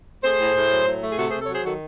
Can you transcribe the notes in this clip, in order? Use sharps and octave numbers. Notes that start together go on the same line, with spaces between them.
A3 G#4 C5
A2
A2
F#3
A2
A3
G#4
C3 F#4 A4
G#4 C5
C3
A4 C#5
F#3 G#4 C5
D#3 F#4 A4